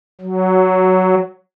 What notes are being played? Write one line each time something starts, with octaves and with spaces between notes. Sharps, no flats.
F#3